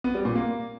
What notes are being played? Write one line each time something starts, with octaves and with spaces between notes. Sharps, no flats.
B3
G3
A#2
A#3